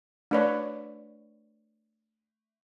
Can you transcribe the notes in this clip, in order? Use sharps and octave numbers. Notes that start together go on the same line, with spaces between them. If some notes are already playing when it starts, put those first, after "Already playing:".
A3 D4 B4 C#5 D5